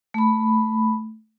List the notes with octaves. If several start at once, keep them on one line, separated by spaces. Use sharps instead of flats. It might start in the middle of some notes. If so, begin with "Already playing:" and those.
A3 B5